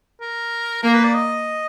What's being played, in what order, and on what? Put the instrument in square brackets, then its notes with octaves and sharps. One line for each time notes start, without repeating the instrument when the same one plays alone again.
[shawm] A#4
[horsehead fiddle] A#3 [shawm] A#4
[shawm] B4
D5
D#5